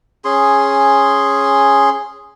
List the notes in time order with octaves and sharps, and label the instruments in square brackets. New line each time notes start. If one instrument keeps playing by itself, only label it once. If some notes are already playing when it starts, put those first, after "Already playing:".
[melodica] C#4 G#4 C6